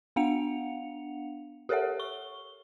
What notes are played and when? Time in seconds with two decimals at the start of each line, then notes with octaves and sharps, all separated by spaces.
0.16 B3 D4 F5 F#5 C#7 F7
1.69 G4 A4 A#4 C#5 E5 F#5
2.00 C#6 G7